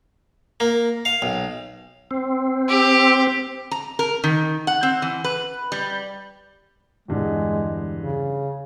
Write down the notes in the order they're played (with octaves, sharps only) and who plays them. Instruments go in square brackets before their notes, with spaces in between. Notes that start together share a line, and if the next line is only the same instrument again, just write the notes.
[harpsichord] A#3
F5
B1
[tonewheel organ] C4
[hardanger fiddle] G4
[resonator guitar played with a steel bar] A#5
A#4
D#3
F#5
C4
E3
B4
G3
[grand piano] E2 G2 D3 [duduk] G#3
[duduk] C#3